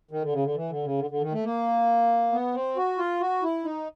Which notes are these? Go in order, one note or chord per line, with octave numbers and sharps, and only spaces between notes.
D#3
D3
C#3
D3
E3
D3
C#3
D3
D3
D#3
A3
A#3
B3
C4
F#4
F4
F#4
E4
D#4